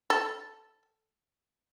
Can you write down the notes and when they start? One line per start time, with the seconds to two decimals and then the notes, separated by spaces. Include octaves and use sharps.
0.10 A4